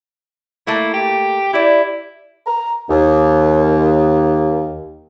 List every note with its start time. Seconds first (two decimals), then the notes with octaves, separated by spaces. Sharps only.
0.67 A3 A#3 E4
0.94 G4
1.53 E4 G4 D5
2.47 A#5
2.90 D#2